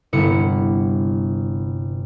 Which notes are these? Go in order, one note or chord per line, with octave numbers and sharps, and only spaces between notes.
G1 C3 B3 E4 C#7